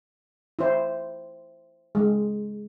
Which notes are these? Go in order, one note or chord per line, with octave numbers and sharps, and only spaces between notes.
E4 C5
G#3